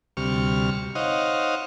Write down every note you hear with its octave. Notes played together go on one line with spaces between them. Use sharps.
D2 C3 G3 C#6 F6
D#4 C5 C#5 D#5 F5 F#5